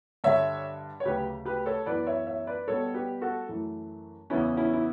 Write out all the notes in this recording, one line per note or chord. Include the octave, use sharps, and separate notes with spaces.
G2 D3 G3 C#5 E5
C#5
D2 C#3 F#3 G4 B4
G4 B4
A4 C#5
F#2 E3 B3 B4 D5
C#5 E5
C#5 E5
B4 D5
B2 G3 B3 A4 C#5
G4 B4
F#4 A4
F#2 E3 A3
E2 C#3 E3 B3 C#4 E4
C#4 E4
E4